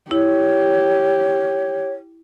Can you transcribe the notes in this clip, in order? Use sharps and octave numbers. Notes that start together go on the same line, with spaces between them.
E4 G4 C#5